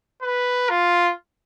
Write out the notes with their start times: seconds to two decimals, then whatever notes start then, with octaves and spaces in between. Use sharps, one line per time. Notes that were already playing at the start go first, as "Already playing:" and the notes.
0.22 B4
0.69 F4